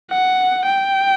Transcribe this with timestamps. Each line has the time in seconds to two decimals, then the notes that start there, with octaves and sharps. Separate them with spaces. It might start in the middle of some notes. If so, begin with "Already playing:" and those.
0.11 F#5
0.66 G5